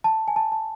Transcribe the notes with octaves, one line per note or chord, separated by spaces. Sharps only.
A5
G#5
A5
A5